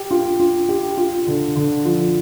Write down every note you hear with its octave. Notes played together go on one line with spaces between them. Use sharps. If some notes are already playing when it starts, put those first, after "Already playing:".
Already playing: G4
F4
F4
G4
F4
D3
D3
F3